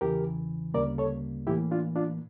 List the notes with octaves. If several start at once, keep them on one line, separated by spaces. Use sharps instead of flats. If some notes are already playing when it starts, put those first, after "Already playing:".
E2 C#3 E3 G4 A#4
D2 C#3 G3 A#3 A#4 D5
A4 C#5
A2 E3 A#3 E4 G4
D4 F4
D4 F4